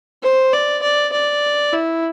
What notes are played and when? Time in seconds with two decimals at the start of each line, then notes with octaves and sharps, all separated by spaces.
0.23 C5
0.53 D5
0.82 D5
1.12 D5
1.73 E4